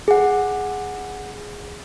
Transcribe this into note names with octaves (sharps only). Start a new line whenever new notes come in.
G#4 F#5